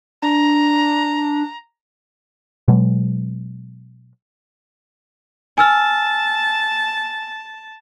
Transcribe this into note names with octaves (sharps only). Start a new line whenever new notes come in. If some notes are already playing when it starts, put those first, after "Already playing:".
D4 A#5
B2 F#3 G#3
G#5 A5 E6 F6